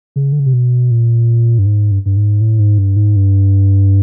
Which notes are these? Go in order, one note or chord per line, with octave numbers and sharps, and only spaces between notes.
C#3
D3
C#3
C3
B2
A#2
G2
G#2
G2
G2
G#2
A2
G#2
G2
G#2
G2